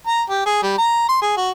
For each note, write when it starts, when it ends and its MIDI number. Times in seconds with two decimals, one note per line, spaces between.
0.07 0.22 82
0.30 0.45 67
0.46 0.61 68
0.63 0.76 55
0.78 1.05 82
1.09 1.18 84
1.22 1.32 68
1.37 1.50 66